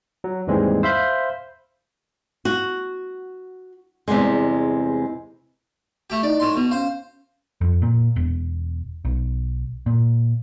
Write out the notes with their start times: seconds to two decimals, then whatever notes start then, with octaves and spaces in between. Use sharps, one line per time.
0.24 F#3
0.47 D#2 G#2 E3 G3 G#3 C4
0.83 C5 E5 F5 B5 G6
2.45 F#4
4.08 E2 C3 F3 G3 G#3
6.10 A3 G4
6.23 D#4 E4 D5 D#5
6.40 A2 C6
6.56 B2
6.71 C#4 C5 F5
7.61 F2
7.82 A#2
8.16 E1
9.05 B1
9.86 A#2